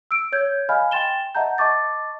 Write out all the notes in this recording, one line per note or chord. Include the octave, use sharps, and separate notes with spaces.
E6 D7
C#5 G6 G#6
D#5 F5 G#5 B5 F6
G5 C6 A6 E7 G7
D#5 E5 F#5 A5 A#5 G6
D#5 A5 C#6 D6 A6